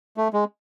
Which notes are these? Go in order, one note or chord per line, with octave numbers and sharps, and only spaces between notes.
A3
G#3